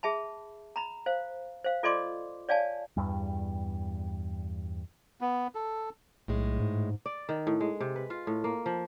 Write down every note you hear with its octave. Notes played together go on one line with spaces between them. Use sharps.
G#4 E5 A5 B5
A#5 B5
C5 F5
C5 F5
F4 A4 D5 D#5 C6 D6
C#5 D5 F5 G#5 A5
E2 G2 G3
B3
A4
B1 A2 G#3
G#2
D5
D#3
A2
G#3
C3
B4
F4
A2
A#3
F3